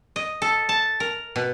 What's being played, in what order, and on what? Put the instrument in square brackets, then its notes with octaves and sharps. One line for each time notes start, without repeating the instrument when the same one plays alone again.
[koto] D#5
A4
A5
A#4
B2